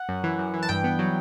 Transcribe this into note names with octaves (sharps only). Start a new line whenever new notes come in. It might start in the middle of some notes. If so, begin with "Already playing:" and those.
Already playing: F#5
F#2
E3
F#2
E3
A5
G2 G5
B3
F#3